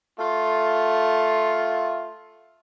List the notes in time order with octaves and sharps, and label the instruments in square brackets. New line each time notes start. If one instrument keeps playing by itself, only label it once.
[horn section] A3 F4